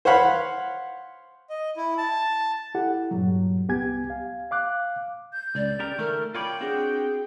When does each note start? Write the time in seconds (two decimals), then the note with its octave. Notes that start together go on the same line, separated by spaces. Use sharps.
0.05 C5 C#5 F5 F#5 B5
1.50 D#5
1.77 E4
1.98 A5
2.75 E4 G4 A4 F#5
3.11 G2 A#2 F#3
3.69 C2 B3 G4 G#5 G#6
4.10 F5
4.51 F5 D6 F#6
5.33 G6
5.55 C#2 D5
5.79 C#3 G4 A#4
5.98 D#3 A3 A#4
6.35 F4 C#5 D5 G5 B5
6.61 C4 D4 F#4 G#4